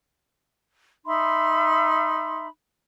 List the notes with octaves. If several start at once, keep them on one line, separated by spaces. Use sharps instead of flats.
D#4 E5 B5 C6